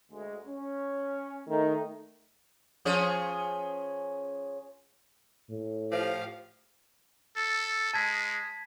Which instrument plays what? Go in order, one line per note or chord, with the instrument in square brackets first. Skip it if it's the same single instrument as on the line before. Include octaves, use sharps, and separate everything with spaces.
[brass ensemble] D2 G#3
C#4
[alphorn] D#3 [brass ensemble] A3 D#4
[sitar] F3 C#4 G#4
[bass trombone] A2
[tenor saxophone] F3 [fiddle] G4 F5
[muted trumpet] A4
[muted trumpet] G#3 [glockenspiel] A5 G#6 B6